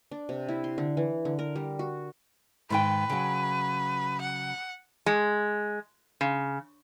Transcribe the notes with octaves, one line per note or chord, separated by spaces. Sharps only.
D4
C3
E4
C6
D3
E3
D3
A#4
G3
F#4
G#2 D#3 B4 G5
C#3 F#3
F#5
G#3
C#3